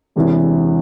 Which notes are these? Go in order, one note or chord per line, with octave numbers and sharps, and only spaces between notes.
E1 E2 C3 E3